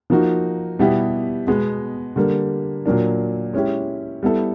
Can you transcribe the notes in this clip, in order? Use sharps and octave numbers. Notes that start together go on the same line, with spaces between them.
F3 A#3 D#4 F#4
B2 G3 B3 E4 G4
B2 G#3 B3
D3 G3 A#3
A#2 F#3 A#3 D4
G#3 C#4 E4 G4
G3 B3 E4 A4